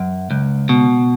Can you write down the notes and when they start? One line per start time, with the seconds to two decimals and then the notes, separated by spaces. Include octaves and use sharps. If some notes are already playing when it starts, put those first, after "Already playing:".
Already playing: F#2
0.31 C#2
0.69 B2